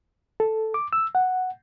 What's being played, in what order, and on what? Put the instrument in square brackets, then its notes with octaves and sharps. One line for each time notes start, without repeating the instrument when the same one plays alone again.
[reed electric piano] A4
D6
E6
F#5